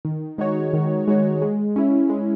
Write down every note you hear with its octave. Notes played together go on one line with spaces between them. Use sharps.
D#3
G#3 D#4 F#4 C#5
D#3
G#3 D#4 F#4 C#5
G#3
C#4 E4
G#3